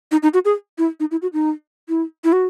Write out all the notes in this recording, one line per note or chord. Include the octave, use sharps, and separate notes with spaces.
D#4
D#4
F#4
G#4
E4
D#4
E4
F#4
D#4
E4
E4
F#4